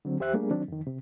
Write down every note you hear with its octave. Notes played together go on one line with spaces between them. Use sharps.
D3 F#3 C4
E2 G4 C5 E5 F#6
G3 A3 A#3 D4 G#4
D#3 F#3 C4 D4
F2 D#3
C3